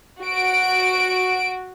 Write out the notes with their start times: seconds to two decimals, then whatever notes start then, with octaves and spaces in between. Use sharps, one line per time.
0.22 F#4 D7